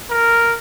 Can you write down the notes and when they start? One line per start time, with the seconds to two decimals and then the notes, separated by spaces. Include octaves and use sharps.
0.11 A#4